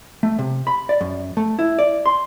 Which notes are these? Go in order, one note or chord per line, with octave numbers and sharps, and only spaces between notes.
A3
C3
B5
D5
F#2
A3
E4
D5
C6